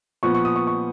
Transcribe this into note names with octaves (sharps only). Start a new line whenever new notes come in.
A#2 F3 B3 C#6
C#6
D#6
C#6
C#6